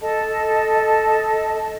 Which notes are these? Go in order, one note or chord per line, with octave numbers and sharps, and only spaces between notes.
A4 D#5 A5